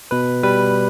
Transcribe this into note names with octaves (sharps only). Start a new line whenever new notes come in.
B2 B4
G3 B4